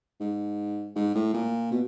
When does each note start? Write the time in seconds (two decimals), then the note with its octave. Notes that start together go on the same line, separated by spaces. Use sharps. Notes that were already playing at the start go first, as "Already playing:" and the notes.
0.20 G#2
0.95 G#2
1.15 A2
1.34 A#2
1.71 B2